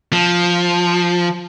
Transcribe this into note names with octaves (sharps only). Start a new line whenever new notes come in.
F3